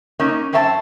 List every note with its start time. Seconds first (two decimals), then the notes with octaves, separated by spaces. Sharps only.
0.20 A#3 C#4 D#4
0.53 F#2 C4 C#4 E5 A5